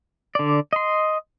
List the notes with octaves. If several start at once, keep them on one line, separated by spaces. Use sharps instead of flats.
D3 D5
D#5 C6